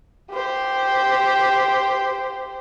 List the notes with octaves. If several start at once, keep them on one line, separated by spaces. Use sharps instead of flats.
G4 C5